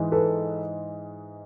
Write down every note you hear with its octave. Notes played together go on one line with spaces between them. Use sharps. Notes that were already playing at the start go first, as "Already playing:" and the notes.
Already playing: G#2 E3 G#3
A4 B4